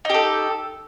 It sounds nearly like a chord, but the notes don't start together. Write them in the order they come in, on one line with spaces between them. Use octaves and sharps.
D#4 G4 A4